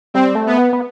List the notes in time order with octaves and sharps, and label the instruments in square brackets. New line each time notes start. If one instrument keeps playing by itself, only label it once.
[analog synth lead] G3 [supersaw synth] C4
[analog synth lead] A3
[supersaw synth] B3
[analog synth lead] B3
B3